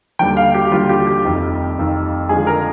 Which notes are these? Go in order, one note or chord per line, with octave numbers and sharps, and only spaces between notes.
D#2 D3 G3 G5
F5
G4
D#2 D3 G3 F4
G4
G4
F1 F2 D#3
F1 F2 D#3
F2 D3 F3 G#3 G#4
A#4